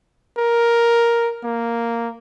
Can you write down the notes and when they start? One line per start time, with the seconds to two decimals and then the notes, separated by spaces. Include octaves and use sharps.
0.38 A#4
1.44 A#3